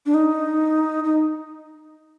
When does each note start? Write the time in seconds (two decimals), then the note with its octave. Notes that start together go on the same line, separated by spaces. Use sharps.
0.06 D4
0.14 D#4
1.04 D#4